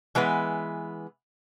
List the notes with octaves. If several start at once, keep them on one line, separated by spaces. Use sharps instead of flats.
E3 G#3 B3 B4